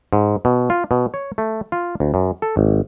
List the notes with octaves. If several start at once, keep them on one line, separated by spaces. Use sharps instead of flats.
G#2
B2
F4
B2
C#5
A3
F4
D2
F#2
A4
G#1